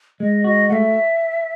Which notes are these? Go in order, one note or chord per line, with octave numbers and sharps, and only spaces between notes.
G#3 D#5
F#4 D#5
A3 E5 F#5